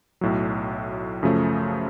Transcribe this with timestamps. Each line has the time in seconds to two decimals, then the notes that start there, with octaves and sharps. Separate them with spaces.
0.21 B1 A2 F#3
1.23 F#2 C#3 F3 A3